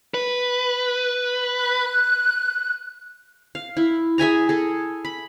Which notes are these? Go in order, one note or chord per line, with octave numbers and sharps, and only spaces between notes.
B4
F#6
F5
E4
G#4 E5 G#5 A#5
G#4 A4
B5